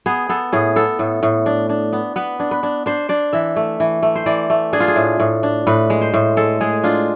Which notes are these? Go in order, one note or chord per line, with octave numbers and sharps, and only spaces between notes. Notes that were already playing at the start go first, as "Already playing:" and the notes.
B3 G#4
B3 A4
A2 G#4
B3 A4
A2
A2
D4
D4
B3
B3 B4
D4
B4
D4
D4 C5
D4 D5
E3 E5
A3
E3
A3
C5
E3 D5
A3
D4 G#4
F4
G#4
A2
A2
D4
A2 B4
G#3
C5
A2
G#3 A4
G#3 G#4
D4 F4